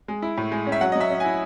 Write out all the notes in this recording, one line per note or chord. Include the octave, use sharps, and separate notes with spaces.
G#3
E4
A2
G#3
C#4
E5
F#3 F#5
F#3 D#5
E5
C#4
E4 G#5